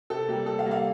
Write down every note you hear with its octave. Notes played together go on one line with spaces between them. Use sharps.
C3 A4
G3 A#3 G4
C3 A4
F5
G3 A#3
F5